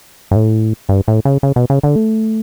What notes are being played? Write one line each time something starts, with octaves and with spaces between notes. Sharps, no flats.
G2
A2
G2
A2
C#3
C#3
B2
C#3
D3
A3